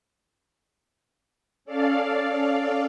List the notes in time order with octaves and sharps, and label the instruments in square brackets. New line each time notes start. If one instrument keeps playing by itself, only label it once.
[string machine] C#4 A4 D5 F5